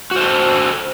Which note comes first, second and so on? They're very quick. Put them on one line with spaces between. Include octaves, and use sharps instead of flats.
F#4 C5 A4